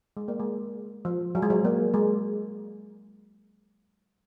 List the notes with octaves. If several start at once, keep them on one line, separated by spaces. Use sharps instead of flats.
G#3
A#3
G#3
F3
F#3
G#3
F#3
A#3
G#3